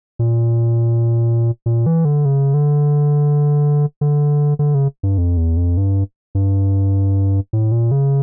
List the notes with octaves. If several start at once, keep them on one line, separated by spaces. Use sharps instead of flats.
A#2
A#2
E3
D3
C#3
D3
D3
D3
C#3
G2
F2
E2
F2
G2
G2
A2
A#2
C#3